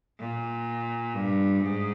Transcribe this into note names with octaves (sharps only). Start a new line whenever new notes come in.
A#2
G2
G#2